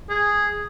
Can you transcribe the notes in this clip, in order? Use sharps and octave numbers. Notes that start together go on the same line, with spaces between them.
G#4